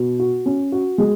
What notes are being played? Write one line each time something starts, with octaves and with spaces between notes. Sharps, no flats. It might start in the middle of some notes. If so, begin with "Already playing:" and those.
Already playing: B2
F#4
C#4
F#4
G#3